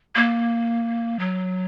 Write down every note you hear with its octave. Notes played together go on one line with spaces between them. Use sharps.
A#3
F#3